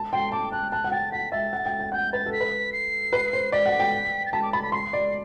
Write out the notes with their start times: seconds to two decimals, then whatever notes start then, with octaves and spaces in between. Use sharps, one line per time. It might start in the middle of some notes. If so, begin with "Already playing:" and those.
Already playing: A5
0.12 G5 C6
0.32 A5 D6
0.52 A5 F#6
0.72 A5 F#6
0.84 F#5
0.92 G5 A6
1.12 F#5 B6
1.32 E5 A6
1.53 F#5
1.66 G5
1.79 G5
1.92 F#5 G6
2.13 B4 A6
2.26 A4
2.32 B6
2.40 B4
2.73 C7
3.13 B4
3.33 C5
3.52 D5 B6
3.66 F#5
3.80 G5
4.26 A6
4.32 A5 B6
4.42 D6
4.53 B5 A6
4.63 B6
4.72 C6 C7
4.93 D5